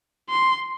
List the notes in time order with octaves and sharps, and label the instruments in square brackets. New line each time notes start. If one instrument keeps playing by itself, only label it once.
[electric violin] C6